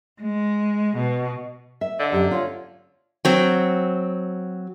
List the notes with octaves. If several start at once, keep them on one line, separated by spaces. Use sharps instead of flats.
G#3
B2
E5
D3 D#5
F#2 G4
F4 C#5
F#3 C4